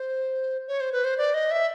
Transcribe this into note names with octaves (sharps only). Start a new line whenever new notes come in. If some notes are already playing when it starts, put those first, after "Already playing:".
Already playing: C5
C#5
C5
B4
C5
D5
D#5
E5